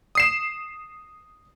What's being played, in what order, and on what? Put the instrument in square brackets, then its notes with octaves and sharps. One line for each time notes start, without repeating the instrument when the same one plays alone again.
[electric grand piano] D#6 C7 E7